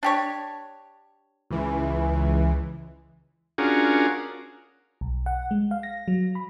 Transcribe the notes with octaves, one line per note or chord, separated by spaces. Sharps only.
D4 G4 C#5
C#2 E3
C#4 D4 F4 F#4 G#4 A#4
B1
F#5
G#3
F5
A#6
F#3
B5